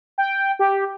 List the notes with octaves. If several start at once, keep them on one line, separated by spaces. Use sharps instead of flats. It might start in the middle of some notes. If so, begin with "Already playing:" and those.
G5
G4